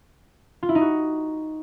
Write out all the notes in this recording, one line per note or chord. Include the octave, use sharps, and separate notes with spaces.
F4
E4
D#4
F#4